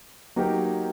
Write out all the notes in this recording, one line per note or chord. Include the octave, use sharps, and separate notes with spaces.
F#3 A#3 D#4 G4 A#4